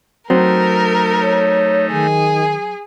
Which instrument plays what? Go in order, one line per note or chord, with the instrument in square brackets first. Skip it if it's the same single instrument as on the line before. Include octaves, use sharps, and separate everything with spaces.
[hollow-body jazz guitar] F#3 C4 [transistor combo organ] A3 D#4 [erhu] A#4
[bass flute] C#5
[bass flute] D#3 [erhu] G#4